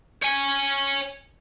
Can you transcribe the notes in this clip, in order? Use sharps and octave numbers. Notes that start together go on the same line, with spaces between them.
C#5 G#5